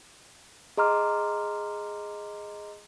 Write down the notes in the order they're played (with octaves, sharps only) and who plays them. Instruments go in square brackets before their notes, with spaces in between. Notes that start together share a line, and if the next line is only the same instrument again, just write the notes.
[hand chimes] G#4 D#5 A#5 C6 D6 F6